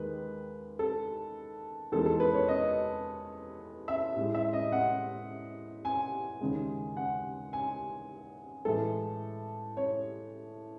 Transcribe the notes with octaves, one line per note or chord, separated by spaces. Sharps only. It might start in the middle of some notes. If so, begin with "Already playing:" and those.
Already playing: D#2 D#3 G#3 B4
A4
E2 D#3 G#3 A4
A4
B4
C#5
D#5
E5
A2 G#3
E5
D#5
F#5
G#5
D#2 C#3 G#3
F#5
G#5
A2 E3 G#3 A4
C#5